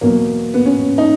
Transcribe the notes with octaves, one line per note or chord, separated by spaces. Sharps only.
E2 B2 F#3 A#3
B3
C#4
D#4